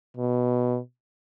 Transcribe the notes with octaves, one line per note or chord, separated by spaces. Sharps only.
B2